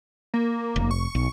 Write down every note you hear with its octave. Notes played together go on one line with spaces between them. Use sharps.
A#3
F1
C#6
B1